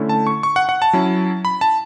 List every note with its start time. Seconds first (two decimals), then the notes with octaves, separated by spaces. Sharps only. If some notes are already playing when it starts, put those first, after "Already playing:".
Already playing: D3 A3 C#4 E4
0.09 A5
0.27 C#6
0.43 C#6
0.56 F#5
0.69 F#5
0.82 A5
0.93 F#3 C#4 E4
1.45 B5
1.61 A5